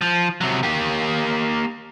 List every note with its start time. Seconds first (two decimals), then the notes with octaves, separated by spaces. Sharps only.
0.01 F3
0.41 C3 F#3
0.63 A#3 G4